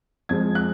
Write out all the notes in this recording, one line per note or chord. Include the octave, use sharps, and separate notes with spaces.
F2 F3 G#3 G#6
F#6